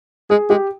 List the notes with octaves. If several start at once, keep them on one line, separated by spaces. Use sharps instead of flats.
G#3 G#4
G#3 G4